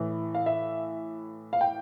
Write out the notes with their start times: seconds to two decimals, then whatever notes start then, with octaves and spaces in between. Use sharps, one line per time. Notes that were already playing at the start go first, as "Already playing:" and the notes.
Already playing: A2 E3
0.35 F5
0.46 E5
1.53 F5
1.61 G5